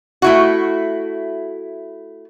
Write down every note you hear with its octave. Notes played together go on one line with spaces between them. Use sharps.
A3 E4 F#4